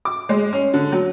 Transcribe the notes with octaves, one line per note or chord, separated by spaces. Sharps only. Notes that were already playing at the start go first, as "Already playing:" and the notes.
D6
G#3
C#4
D3
F#3